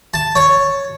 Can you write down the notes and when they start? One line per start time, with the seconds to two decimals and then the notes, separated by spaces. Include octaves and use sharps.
0.14 A5
0.36 C#5